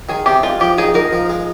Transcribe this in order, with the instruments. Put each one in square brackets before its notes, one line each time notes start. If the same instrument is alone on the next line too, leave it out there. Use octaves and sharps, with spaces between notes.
[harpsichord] D#3 [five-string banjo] G#4
[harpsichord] C3 [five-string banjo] G4
[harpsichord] G#3 [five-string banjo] F4
[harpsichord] F3 [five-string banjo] G4
[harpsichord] D#4 [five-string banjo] G#4
[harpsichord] D#4 [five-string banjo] A#4
[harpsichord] F3
G#3